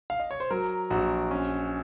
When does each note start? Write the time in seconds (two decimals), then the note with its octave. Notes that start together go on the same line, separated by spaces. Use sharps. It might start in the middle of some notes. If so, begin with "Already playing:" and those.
0.10 F5
0.20 D#5
0.31 C#5
0.40 C5
0.51 F#3 A#4
0.90 A#1 F#4
1.31 C#4